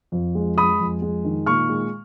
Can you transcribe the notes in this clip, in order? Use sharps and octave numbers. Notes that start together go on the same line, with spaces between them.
F2
G#3
G#3 B5 D#6
F2
G#3
D#3
A#2 C#6 F6
G#3